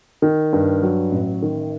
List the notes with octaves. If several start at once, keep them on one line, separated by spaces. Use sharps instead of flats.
D#3
G2
F#3
A1
D#3